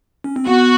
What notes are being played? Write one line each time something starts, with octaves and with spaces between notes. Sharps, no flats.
C#4
C4
B3 F#4